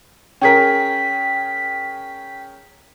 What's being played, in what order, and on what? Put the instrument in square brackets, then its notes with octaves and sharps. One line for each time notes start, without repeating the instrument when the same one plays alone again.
[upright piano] C#4 G#4 A#4 [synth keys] G5 B6